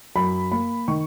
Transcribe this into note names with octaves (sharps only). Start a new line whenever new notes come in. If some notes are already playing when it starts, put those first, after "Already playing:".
F#2 B5
A#3 B5
D#3 C#6